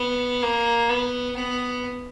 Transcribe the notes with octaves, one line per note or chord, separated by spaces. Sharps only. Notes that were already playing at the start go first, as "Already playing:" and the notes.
Already playing: B3
A#3
B3
B3